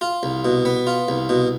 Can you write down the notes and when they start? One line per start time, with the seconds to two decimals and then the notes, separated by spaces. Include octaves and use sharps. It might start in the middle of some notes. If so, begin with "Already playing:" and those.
0.01 F4
0.23 C2
0.45 B2
0.65 B3
0.87 F4
1.08 C2
1.29 B2